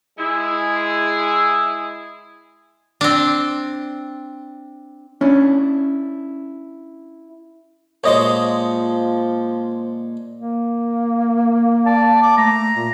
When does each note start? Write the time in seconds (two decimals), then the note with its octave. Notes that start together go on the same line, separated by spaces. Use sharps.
0.18 G#3 E4 G#4
3.01 C4 D4
5.21 C#4 D4 E4
8.04 A#2 F3 G#3 C5 C#5 D#5
10.37 A#3
11.86 D5 A5
12.23 D6
12.38 A3 A#5
12.75 A#2